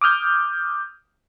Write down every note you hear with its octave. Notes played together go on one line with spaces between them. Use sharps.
D6 D#6 F6 G6